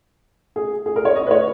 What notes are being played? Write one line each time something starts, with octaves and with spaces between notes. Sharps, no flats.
G#4
G#4
A#4
C#5
D#5
B4
C#5